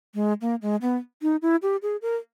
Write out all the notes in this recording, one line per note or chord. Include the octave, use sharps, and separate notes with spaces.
G#3
A#3
G#3
B3
D#4
E4
G4
G#4
A#4